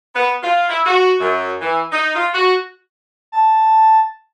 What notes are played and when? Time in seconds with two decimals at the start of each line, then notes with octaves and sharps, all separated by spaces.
0.15 B3
0.43 F4
0.69 E4
0.86 F#4
1.20 F#2
1.61 E3
1.92 D#4
2.15 F4
2.34 F#4
3.32 A5